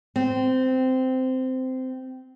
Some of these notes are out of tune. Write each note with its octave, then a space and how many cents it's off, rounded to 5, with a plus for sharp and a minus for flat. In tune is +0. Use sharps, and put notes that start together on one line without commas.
C4 -15